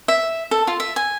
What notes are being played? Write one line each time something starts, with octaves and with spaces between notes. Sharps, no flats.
E5
A4
F4
E5
G#5